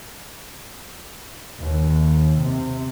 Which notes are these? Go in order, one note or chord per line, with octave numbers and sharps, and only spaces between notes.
D#2
C3